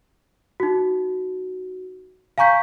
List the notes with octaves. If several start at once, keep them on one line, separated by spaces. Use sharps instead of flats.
D#4 F#4
F5 G#5 A#5 C#6 G6 B6